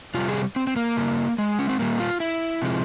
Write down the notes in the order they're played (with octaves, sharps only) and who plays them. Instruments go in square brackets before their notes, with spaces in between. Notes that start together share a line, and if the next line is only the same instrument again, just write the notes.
[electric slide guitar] C3 G3 F4
G#4
C4
C4
A#3
C#3 G3
G#3
C#4
C4
A#2 G3 A#3
F4
E4
C3 F3 G#3